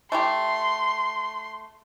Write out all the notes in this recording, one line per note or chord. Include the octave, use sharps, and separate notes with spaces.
A3 E4 G4 C6